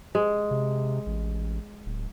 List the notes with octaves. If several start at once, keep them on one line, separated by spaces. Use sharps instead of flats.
G#3
C3
A1
D1